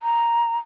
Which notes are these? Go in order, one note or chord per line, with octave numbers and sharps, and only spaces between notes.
A#5